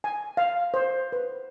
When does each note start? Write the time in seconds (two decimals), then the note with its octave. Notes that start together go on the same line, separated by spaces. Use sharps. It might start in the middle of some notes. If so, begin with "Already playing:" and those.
0.04 G#5
0.37 F5
0.74 C5
1.12 B4